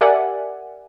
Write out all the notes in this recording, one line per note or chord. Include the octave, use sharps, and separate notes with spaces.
G4 A#4 D5 E5 F#5 G#5